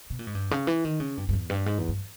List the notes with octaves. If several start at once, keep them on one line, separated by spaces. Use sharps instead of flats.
B2
A#2
G#2
G2
C#3
E3
D#3
C#3
G2
G2
E2
G2
G#2
E2
G2